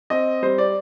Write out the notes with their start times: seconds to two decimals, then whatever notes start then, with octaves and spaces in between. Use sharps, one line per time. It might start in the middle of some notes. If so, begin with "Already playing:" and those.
0.10 C4 D#5
0.42 G3 C5
0.58 D5